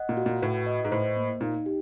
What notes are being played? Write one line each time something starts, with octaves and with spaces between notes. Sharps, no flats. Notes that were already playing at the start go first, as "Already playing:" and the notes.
Already playing: D#5 F#5
A#2
F#4
A#2
A2 B4
D#5
G#2
A2 C5
A#3
A#2 D#4
G4